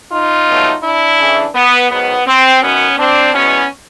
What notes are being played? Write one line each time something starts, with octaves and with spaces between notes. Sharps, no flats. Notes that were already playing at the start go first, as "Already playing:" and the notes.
D#4 F4
B2 F#3 A3
D4 E4
C#3 E3 A3
B3
G#2 D#3 F#3 B3
C4
F#2 D#3 F#3 B3 C#4
C4 D4
E2 B2 G#3 B3 C#4